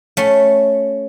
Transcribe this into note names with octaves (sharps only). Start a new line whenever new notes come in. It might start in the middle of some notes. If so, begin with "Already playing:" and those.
A3 C#4